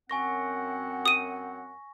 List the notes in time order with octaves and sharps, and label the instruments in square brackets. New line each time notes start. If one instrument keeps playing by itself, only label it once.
[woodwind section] F#2 C4 F#5 [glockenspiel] G#5 C#6 A#6
[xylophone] D#6 D#7